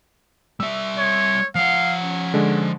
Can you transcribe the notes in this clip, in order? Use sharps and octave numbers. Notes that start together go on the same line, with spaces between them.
G3 E5 E6
C#5
F3 F5 F#5
C#4
D3 G#3 D4